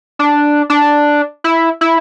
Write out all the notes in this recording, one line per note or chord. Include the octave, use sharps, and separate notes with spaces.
D4
D4
E4
E4